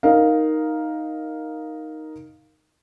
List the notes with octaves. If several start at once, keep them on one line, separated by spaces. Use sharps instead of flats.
D#4 A#4 F5